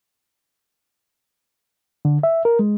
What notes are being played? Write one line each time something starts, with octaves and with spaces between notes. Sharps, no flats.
D3
E5
A#4
G#3